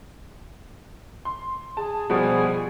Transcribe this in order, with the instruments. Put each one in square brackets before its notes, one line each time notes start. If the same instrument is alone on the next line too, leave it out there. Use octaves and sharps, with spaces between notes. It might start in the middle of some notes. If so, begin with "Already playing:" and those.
[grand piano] C6
[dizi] G#4 [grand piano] A5
[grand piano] B2 F3 G3 [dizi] G#4